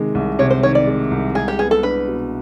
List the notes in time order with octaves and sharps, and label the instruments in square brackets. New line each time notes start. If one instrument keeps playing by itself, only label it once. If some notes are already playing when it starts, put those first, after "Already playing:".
Already playing: [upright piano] C3 D#3 G#3
C2
[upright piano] C3 [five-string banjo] C#5
[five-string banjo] C5
[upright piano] D#3 [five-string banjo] C#5
[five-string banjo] D5
[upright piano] G#3
C2
[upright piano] G#3 [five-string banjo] G#4
[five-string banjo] G4
[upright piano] B3 [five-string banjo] G#4
[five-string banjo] A4
[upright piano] D4 [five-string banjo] B4
[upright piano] B2